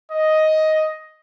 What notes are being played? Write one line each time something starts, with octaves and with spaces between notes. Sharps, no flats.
D#5